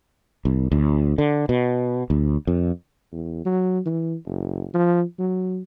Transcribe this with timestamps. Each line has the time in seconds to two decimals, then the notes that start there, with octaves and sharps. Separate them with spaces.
0.45 C2
0.72 D2
1.18 D3
1.49 B2
2.10 D2
2.47 F2
3.12 E2
3.45 F#3
3.86 E3
4.25 F#1
4.74 F3
5.19 F#3